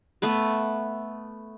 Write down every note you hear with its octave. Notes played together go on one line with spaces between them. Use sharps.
A3 B3 B4